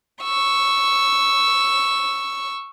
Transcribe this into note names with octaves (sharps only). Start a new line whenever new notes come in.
C#6 E6